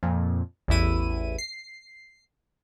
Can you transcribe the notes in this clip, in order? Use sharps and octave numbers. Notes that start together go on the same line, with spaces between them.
F2 A#2
A1 E2 E3 E4 D#7
C7